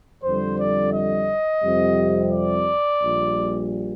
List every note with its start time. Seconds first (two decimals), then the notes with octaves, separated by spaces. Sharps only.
0.23 F2 D3 G3 C5
0.58 D5
0.93 D#5
1.62 F2 C3 G3
2.31 D5
2.99 A#1 A#2 G3